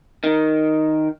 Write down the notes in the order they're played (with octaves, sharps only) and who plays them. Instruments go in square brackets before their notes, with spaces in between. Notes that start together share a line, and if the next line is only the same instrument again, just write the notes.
[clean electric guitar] D#3